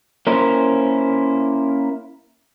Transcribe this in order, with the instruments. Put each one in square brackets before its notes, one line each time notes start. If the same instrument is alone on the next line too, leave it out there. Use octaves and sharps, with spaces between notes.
[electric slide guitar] A#3 C#4 E4 A#4 C5